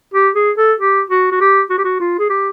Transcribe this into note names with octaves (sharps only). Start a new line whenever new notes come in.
G4
G#4
A4
G4
F#4
F#4
G4
F#4
G4
F#4
F4
G#4
G4